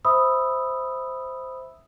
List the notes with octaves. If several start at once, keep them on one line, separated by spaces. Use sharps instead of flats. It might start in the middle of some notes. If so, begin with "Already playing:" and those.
C5 E5 B5 D#6 E6